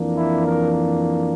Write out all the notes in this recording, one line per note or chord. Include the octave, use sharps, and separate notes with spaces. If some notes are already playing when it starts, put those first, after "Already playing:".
Already playing: F2 E3 A#3 D4
E4
A#4